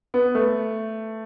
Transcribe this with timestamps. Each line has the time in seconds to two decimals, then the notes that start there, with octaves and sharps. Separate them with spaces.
0.14 B3
0.35 A3